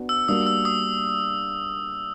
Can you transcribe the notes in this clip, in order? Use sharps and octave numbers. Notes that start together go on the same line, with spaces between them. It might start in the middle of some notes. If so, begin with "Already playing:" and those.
Already playing: B3 D4 F#4
E6
G3 A#3 D4 F#4 D#6
E6
D#6